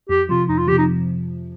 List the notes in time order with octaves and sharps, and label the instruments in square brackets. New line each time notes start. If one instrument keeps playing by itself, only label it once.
[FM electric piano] F2 [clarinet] G4
[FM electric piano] C3 F3 [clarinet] F4
[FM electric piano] F2 [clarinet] D#4
[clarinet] F4
[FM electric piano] F3 [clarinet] G4
[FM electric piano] C3
[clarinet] D#4